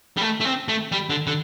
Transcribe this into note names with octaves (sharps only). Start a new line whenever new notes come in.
G3
A3
A3
C4
A3
G3
D3
D3